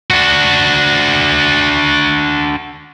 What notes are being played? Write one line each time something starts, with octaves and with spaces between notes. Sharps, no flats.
D4 F#4